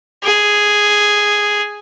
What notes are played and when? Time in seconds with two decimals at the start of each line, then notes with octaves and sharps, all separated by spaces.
0.24 G#4